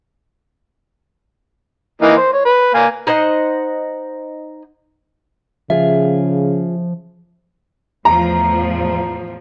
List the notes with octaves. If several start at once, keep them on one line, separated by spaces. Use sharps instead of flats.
E3 A#3 D#4
C5
C#5
B4
A#3 F5 G#5
D#4 C5 D#5 F#5
C#3 F3 F4 G#4 E5
E2 A2 F3 A#5